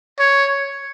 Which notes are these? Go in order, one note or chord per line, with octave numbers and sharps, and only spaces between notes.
C#5